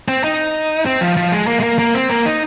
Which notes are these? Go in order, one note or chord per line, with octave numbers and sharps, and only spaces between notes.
C4
D#4
C4
F3
F3
G#3
A#3
G#3
A#3
A#3
C4
A#3
D#4